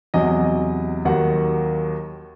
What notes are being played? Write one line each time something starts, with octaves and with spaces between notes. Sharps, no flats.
E2 C3 F#3 D#5
D#2 D#3 F#3 F#5